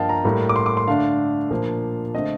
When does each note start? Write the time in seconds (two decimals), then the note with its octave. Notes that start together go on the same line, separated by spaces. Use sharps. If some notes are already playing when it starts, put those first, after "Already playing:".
Already playing: G2 F3 A#3 D#5 F5 G5 A5
0.09 A#5
0.24 A2 G3 A#3
0.49 D6
0.56 C6
0.66 D6
0.77 C6
0.88 D3 A3 D4 F5
1.51 A#2 F3 A#3 D4
2.15 D3 A3 C4 D#5